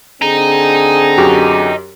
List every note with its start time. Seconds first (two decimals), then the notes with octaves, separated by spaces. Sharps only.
0.22 D3 C4 G#4 D#5 A#5
1.18 F#2 F#4 G4